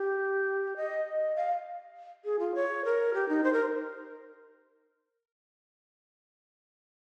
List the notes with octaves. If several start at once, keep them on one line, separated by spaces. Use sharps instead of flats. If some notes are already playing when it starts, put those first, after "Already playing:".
Already playing: G4
D#5
F5
G#4
F4
C#5
A#4
G4
D#4
C5
A#4